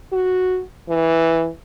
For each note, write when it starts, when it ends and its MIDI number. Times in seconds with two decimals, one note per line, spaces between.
0.12 0.60 66
0.88 1.48 52